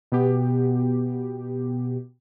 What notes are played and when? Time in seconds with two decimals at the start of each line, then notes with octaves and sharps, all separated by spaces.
0.12 B2 B3 G4